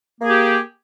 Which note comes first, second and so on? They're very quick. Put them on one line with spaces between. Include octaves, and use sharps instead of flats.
A#3 G#4 G4